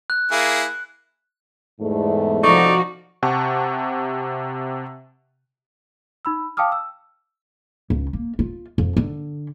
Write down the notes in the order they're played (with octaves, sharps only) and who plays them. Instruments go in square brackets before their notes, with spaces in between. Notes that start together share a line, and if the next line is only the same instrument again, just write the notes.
[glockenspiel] F#6
[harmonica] A#3 E4 G#4
[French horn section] E2 G#2 A3
[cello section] C3 F3 F#4 [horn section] D#4 A4 D5 [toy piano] C#6
[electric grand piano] C3 G4 F#5 A5 C#6
[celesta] D#4 B5 E6
F5 G5 A5 D6 D#6 F6
E6
[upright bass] C#2
A#3
F4
F2
D3